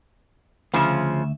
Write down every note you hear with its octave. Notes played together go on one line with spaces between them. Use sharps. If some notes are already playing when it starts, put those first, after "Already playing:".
D2 C#3 F3 E5